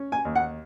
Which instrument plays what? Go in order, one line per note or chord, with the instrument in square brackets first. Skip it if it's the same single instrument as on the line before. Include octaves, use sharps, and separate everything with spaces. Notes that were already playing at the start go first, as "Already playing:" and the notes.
Already playing: [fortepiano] C#4
G#5
D#2
F#5